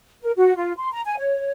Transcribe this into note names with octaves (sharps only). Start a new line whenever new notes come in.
A#4
F#4
F4
C6
A#5
G#5
C#5